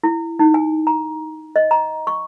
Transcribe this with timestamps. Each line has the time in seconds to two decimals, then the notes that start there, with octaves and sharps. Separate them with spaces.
0.03 E4
0.39 D#4
0.54 G#5
0.87 A#5
1.56 D#5
1.71 A#5
2.07 C#6